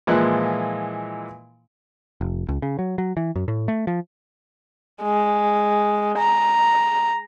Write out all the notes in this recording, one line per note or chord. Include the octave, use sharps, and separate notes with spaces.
A#2 E3 F3 G#3 E4 F#6
F1
C#2
C#3
F#3
F#3
E3
F#2
A2
A3
F3
G#3
A#5